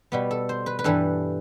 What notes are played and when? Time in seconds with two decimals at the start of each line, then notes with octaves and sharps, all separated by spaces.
0.12 B2 G3 B3
0.31 A4
0.49 C5
0.66 B4
0.79 B4
0.84 G2 E3 G3 A4